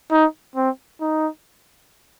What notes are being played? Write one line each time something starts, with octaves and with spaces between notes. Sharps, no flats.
D#4
C4
D#4